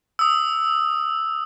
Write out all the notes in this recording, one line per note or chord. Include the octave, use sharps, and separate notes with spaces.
D#6 E6